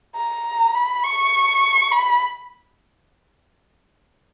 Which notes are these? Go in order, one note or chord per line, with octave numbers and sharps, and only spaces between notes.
A#5
B5
C#6
B5